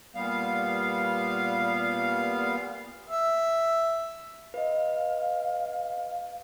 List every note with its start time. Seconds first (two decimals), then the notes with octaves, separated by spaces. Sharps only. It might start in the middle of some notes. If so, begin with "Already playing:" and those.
0.15 A#2 G3 B3 F5
3.10 E5
4.54 B4 D#5 F5